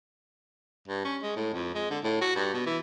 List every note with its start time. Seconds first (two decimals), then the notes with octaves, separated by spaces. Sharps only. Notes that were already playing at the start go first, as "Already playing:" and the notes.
0.88 G2
1.05 C#4
1.22 G#3
1.36 A2
1.54 F2
1.75 G#3
1.90 D3
2.04 A2
2.21 F#4
2.36 G2
2.54 B2
2.66 E3